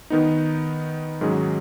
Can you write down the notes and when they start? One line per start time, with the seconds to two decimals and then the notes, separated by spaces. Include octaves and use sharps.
0.10 D#3 B3 D#4
1.21 G#2 D#3 F#3 C#4 G#4